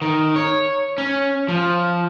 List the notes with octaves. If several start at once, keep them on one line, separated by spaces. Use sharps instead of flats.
D#3
C#5
C#4
F3